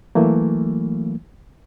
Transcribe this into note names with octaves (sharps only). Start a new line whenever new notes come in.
E3 F#3 A3 A#3